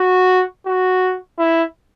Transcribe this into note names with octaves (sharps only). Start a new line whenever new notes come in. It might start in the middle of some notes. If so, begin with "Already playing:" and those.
Already playing: F#4
F#4
E4